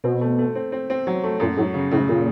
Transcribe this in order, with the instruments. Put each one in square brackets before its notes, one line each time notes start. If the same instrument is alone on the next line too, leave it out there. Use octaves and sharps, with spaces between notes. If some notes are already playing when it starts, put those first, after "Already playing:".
[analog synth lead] B2 [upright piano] C4
[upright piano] A3
A3
C4
C4
C4
F#3
A3
[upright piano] F#2 [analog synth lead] A#2
[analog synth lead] A2 [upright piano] F#3
[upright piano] C#3
[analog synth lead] A2 [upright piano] C#3
[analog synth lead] A#2 [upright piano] C#3